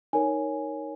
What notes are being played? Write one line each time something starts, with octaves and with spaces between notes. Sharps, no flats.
D#4 A#4 C#5 G#5